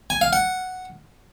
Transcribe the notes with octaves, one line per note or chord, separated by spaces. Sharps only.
G#5
F5
F#5